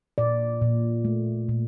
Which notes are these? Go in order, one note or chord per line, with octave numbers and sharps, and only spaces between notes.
A#2 D5
A#2
A3
A#2